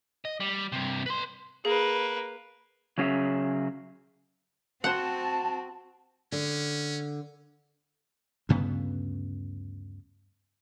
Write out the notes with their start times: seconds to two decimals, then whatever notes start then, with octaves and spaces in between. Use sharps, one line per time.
0.25 D#5
0.40 G3
0.72 G2 C3
1.06 B4 C6
1.65 A#3 G#4 B4
2.98 C#3 F#3 C#4 G#4 D#5 E5
4.84 C4 F#4 C5 F#5 A5
6.32 D3 C#4
8.49 D2 G2 C#3 B3